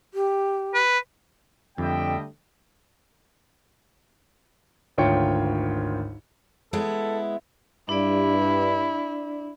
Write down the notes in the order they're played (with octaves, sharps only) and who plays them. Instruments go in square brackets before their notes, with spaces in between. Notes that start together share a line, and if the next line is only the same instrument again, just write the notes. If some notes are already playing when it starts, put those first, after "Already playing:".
[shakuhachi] G4
[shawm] B4
[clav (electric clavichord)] F2 [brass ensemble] D3 G3 A3 [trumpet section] D#5 E5 G5
[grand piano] G#1 D2 F4 C#5 G5 C#7
[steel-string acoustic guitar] G#3 B3 E4 [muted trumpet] A4
[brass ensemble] G2 [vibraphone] D4 D5 [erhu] E4